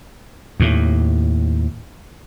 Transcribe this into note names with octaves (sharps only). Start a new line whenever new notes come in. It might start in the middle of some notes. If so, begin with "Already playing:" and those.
D#2 A2